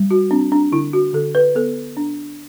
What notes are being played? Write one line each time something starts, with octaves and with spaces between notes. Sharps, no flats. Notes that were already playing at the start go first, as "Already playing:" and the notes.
Already playing: G3
F#4
C4 D4
D4
D3 E4
F#4
D3 A4
B4
B3 A4
D4